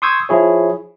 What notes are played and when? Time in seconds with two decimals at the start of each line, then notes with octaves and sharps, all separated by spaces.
0.02 C6 C#6 D#6 E6 G6 G#6
0.29 F3 E4 G#4 C#5